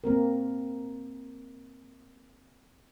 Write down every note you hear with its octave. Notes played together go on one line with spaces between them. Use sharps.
A#3 C4 A#4